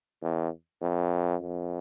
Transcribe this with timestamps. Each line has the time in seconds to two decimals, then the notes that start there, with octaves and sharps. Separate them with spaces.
0.22 E2
0.82 F2
1.42 F2